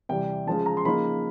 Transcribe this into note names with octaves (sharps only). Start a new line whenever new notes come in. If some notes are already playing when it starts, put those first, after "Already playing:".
C3 E3 G3 G5
C#3 F3 G#3 A5
A#5
C6
C#3 F3 A#3 D#4 B5